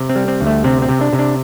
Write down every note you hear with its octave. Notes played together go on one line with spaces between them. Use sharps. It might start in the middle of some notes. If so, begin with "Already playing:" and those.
Already playing: C3
C4
G3
C4
D2
A3
C3 C4
C4
C3
D4
C3
D4